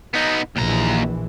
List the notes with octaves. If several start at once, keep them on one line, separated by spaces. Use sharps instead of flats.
B3 D#4
A#1 D#2 E3 A#5